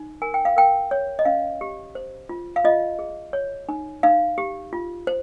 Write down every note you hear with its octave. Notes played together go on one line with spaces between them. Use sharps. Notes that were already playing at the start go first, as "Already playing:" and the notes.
Already playing: D#4
A#4 G#5
G5
F5
A#4 G5
C#5
D#5
C#4 F5
G4
C5
F4
F5
F4 D#5
G#4
C#5
D#4
D#4 F5
G4
F4
C5